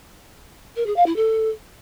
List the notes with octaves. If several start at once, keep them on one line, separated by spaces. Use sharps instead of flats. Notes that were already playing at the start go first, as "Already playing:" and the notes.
A#4
G#4
F5
E4
A4